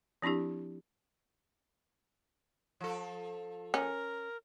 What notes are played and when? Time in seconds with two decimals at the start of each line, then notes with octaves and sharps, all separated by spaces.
0.22 F3 C4 D4 E4 G4
2.81 F3 A4
3.74 C#4 A#4